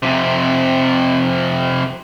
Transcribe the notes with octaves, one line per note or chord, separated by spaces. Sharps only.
F2 C3